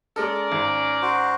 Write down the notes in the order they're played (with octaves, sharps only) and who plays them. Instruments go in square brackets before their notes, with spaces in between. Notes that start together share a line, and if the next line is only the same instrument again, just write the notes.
[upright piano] G#3 A4 [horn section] C#4 A#4 D5
[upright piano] G#1
[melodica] F#4 C5